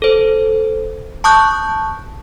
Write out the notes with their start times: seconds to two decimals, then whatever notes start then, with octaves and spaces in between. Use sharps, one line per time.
0.02 A4 C5
1.24 A5 C#6 D#6 F#6 G6